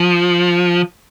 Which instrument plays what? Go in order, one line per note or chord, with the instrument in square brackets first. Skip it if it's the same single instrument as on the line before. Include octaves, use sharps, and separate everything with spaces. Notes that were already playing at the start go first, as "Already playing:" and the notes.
Already playing: [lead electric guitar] F3